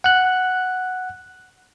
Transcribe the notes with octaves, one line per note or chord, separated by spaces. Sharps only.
F#5 F#6